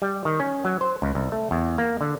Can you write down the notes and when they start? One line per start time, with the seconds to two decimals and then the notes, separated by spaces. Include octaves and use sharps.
0.02 G3
0.25 D#3
0.40 C#4
0.65 F#3
0.81 C5
1.02 C#2
1.15 C2
1.32 A3
1.51 E2
1.78 A#3
2.01 D3